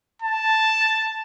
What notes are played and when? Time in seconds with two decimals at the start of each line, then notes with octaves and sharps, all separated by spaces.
0.22 A5